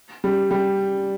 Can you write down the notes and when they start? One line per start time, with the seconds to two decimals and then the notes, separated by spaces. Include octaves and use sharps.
0.24 G3
0.51 G3